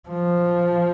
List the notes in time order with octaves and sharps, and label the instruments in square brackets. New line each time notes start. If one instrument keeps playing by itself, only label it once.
[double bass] F3